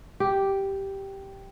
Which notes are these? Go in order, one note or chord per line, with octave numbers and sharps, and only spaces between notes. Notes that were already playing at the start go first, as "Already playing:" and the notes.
G4